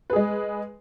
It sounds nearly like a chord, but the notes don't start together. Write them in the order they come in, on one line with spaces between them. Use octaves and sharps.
B4 G#4 G#3